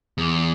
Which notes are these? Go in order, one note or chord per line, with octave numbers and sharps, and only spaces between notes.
E2